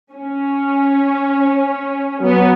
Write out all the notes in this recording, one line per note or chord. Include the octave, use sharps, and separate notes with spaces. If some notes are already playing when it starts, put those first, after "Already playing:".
C#4
F#3 B3